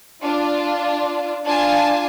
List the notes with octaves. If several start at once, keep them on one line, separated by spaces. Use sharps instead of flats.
D4 F4
D4 F4 G#5 A5